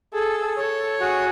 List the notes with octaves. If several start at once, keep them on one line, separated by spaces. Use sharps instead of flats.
G#4 A4
A4 C#5
F#4 G#4